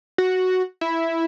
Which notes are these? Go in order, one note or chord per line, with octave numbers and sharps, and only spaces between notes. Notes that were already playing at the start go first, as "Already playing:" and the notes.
F#4
E4